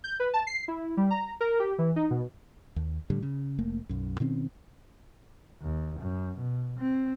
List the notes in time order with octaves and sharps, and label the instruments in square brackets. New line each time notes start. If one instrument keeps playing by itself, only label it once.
[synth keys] G6
B4
A5
C7
E4
G3
A#5
A#4
G4
E3
D#4
B2
[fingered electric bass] D#2
A2 D3 G3
C#3
F1 A3 A#3
B1 F#2
B2 D#3 C4 C#4
[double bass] D#2
F#2
B2
C4